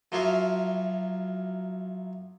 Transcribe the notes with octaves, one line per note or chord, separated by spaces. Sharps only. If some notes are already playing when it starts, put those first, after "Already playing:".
F#2 F3 F#3 E4 F4